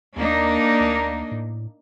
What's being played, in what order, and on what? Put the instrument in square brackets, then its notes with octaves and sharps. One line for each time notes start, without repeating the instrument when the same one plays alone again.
[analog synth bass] D#2 [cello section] A#3 D4 D#4
[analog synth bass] D2
A2